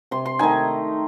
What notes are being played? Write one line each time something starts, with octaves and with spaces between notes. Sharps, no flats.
C3 C6
C6
D#3 A3 D#4 G#5